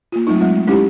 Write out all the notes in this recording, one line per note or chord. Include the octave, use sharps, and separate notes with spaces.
A#3 F4
F#3 A3 C4 D#4
F#3 G#3 C4 D#4 F4
G#3 A3
G#3 C#4 D#4 E4 G4 E5